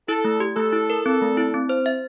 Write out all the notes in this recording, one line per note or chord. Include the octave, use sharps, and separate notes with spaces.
E4 A4
A3
G4
A3 A4
E4
A#4
C4
A3
E4
C4
C5
E5